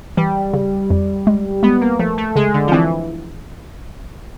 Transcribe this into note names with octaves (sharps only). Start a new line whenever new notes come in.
E3 G3
C#3
F2
G#3
G#3 B3
A#3
F3 A3
A3
C#3 G#3
D3
F3
E3 C4